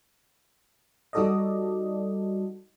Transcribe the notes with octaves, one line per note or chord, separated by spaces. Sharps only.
G3 D#4 F#4 A4 D5 D#5